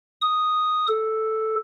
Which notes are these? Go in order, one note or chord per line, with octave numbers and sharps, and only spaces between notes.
D#6
A4